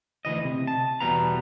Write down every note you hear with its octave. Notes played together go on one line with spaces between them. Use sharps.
D2 C#3 E3 D#5
C3
A5
E2 B2 G3 B3 A#5